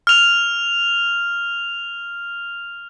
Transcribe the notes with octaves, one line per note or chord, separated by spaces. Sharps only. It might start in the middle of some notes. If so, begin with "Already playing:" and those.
F6 F7